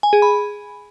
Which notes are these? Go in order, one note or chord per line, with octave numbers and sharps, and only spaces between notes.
G#5
G#4
B5